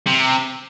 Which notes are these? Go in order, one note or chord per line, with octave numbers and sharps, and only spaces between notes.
C3